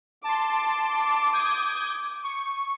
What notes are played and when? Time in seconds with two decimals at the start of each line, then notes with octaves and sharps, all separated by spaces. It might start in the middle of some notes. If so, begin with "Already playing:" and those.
0.24 A5 C6 D6
1.33 D#6 G6 G#6
2.23 C#6